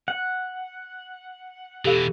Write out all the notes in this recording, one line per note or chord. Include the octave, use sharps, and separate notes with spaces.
F#5
B2 E3 G4 A4 F5